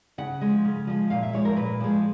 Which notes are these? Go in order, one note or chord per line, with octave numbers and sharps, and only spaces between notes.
C#3 F#5
F3 G#3
C#3
F3 G#3
A#2 F5
E5
F3 G#3 C#5
A#4
A#2 B4
F3 G#3